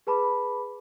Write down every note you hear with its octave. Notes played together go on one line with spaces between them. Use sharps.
G#4 B4 A5 B5 D6